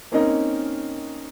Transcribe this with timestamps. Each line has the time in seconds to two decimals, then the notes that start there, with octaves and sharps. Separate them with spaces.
0.12 A#3 C4 C#4 D#4 A#4 D#5